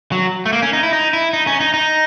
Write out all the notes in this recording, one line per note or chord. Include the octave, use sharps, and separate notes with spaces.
F#3
A3
A#3
C#4
D#4
E4
D#4
E4
D#4
C#4
D#4
D#4